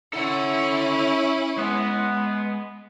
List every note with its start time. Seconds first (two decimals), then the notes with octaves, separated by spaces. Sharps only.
0.13 C#4 E4 A4 F#5
1.58 G#3 B3